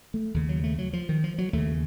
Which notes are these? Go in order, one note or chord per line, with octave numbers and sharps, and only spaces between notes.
A3
D#2 C#3
F#3
A3
F#3
F3
D#3
F3
F#3
D#2 C#3 A3